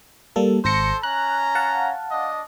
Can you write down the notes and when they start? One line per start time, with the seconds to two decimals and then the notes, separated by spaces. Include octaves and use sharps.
0.36 G3 A#3 A4
0.65 G#1 A4 C5 A#6 C#7
1.03 C#4 A#5 F#6
1.55 F5 F#5 A5
2.12 D4 D#5